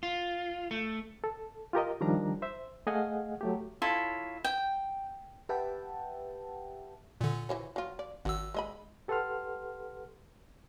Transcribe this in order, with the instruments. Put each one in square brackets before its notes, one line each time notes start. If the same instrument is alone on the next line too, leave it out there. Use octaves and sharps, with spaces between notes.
[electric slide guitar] F4
A3
[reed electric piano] A4
F4 G4 A#4 D#5
D#3 F3 G3 D4 A#5
C5 E5
A3 G#4 D#5 F5 F#5 G#5
F#3 A3 G4
[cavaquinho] E4 F4 A4 C#5
G5
[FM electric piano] G4 B4 E5 F#5 G5 A5
[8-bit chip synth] A#2 D3
[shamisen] E3 C5 C#5
F#3 F4
D5
[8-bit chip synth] G#1 E6 [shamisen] F#4
[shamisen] G#3 D#5 B5
[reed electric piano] G4 A4 B4 F#5 C6 F6